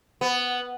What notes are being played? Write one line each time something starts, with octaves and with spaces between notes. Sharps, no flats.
B3